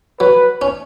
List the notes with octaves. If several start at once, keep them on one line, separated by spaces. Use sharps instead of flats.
F#3 B4
C#4